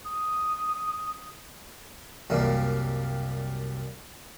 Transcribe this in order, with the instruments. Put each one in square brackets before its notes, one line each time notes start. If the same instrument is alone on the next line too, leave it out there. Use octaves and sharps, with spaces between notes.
[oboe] D#6
[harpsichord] C2 F#2 G3 A#3